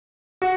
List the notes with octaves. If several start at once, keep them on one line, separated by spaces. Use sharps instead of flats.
F#4